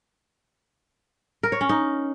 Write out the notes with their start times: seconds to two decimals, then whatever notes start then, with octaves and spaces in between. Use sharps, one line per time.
1.43 A#4
1.52 C#5
1.61 C#4
1.69 D#4